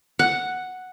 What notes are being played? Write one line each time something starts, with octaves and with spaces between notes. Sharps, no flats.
F#5